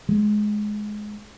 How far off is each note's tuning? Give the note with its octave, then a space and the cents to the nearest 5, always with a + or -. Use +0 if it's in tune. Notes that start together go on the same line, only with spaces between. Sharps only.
G#3 +15